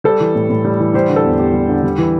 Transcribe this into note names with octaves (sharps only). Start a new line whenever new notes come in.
G3 A4
E3
A2
A2
G3
E3
G3 G4 C5
D3
A4
E2
E2 G4
G3
D3
G3
E3